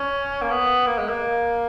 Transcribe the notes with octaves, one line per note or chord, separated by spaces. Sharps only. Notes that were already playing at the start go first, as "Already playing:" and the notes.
Already playing: C#4
A#3
B3
A#3
G#3
A#3